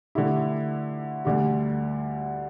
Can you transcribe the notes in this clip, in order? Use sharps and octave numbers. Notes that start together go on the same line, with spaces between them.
D3 A3 E4 G4
D2 D3 G3